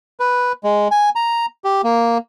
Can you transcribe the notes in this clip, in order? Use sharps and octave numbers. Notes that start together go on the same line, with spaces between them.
B4
G#3
G#5
A#5
G4
A#3